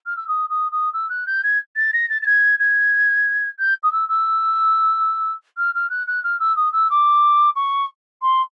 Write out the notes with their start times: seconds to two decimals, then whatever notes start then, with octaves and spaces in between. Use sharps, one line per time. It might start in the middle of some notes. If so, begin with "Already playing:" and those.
0.06 F6
0.17 E6
0.28 D#6
0.50 D#6
0.72 D#6
0.93 E6
1.09 F#6
1.27 G6
1.43 G#6
1.76 A6
1.93 A#6
2.10 A6
2.22 A6
2.26 G#6
2.59 G#6
3.59 G6
3.83 D#6
3.92 E6
4.09 E6
5.57 F6
5.74 F6
5.90 F#6
6.07 F#6
6.24 F6
6.40 E6
6.56 D#6
6.73 E6
6.90 D6
7.56 C#6
8.22 C6